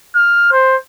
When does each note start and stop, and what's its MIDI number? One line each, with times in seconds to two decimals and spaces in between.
0.16 0.48 89
0.52 0.76 72